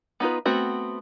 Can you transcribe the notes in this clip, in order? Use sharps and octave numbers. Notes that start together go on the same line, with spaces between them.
B3 D#4 F4 B4
A3 B3 C4 F#4